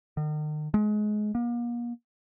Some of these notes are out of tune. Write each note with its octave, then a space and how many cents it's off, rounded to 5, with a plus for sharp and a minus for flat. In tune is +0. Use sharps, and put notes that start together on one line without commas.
D#3 -40
G#3 +25
A#3 +40